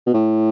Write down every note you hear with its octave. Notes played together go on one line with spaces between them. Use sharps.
B2
A2